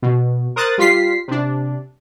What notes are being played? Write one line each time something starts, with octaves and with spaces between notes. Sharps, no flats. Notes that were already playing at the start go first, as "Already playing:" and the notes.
B2
A#4 C5 D#6 F#6 A6
G3 F4 B6 C7
C3 D4